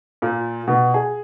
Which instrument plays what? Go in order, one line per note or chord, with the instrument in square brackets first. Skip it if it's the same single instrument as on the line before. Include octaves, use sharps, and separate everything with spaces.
[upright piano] A#2
B2
G#4